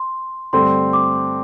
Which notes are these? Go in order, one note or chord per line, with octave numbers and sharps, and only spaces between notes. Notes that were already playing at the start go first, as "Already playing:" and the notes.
Already playing: C6
G2 D3 A3 C4 C6
D6